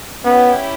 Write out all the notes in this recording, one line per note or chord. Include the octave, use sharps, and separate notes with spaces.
B3 C#4 E4 G4